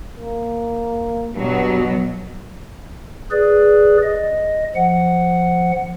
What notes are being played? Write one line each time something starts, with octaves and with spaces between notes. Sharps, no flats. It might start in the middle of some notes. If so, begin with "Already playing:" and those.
A#3
G2 B2 F#3
G#4 B4 D5
D#5
F3 F#5